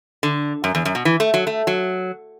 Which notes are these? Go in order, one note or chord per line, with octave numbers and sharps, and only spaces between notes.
D3
F#2
E2
F#2
B2
E3
A3
F#3
A3
F#3